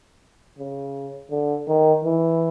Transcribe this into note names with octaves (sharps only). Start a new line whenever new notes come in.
C#3
D3
D#3
E3